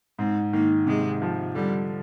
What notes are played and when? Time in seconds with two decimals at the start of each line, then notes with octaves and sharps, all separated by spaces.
0.19 G#2 C4
0.53 D#3 A#3
0.87 C3 G#3
1.22 F3
1.55 D3 G3